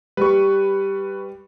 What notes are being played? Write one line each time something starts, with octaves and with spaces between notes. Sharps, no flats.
G3 B4 C#6